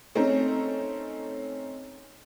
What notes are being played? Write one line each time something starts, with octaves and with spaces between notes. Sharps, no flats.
A3 C4 C#4 D#4